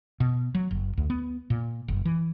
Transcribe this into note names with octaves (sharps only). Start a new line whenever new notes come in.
B2
F#3
F#1
D2
B3
A#2
F#1
E3